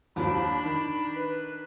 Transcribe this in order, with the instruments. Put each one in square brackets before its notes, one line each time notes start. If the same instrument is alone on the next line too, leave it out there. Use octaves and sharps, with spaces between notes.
[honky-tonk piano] D#2 F3 [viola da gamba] D4 [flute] B5
[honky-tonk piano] D#3
[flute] B4